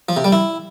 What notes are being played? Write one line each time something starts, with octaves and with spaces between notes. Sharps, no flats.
F3
C3
G3
E4